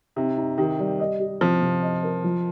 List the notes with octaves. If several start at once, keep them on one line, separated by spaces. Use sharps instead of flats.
C3 D#4
D#4
D#3 G4
G3
D#5
G4
C3 F3
C3
D#5
A#4
F3